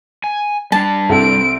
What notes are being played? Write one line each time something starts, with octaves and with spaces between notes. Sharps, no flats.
G#5
G3 D4 A5
C2 C4 A4 F#5 D7